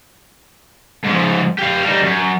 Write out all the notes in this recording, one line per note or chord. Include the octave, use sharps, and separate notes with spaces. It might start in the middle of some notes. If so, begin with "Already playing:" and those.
G#2 F3
G4 F5
G3 D#4
F#2